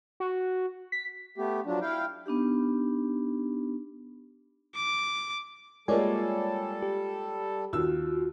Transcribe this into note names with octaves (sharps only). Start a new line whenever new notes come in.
F#4
B6
A3 B3 G4
F3 F#3 D4
E4 F5 G5
B3 D4 D#4 G4
D6
G3 G#3 A#3 F4 A4 C#5 D5 G#5
G4
D#2 F4 F#4 E6